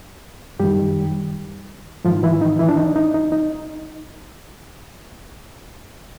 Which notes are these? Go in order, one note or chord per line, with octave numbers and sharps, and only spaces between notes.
F#2 D#3 G3 G4
G#2 D#3 F3 F4
E3 E4
D#4
E3 E4
D4
D#4
D#4
D#4
D#4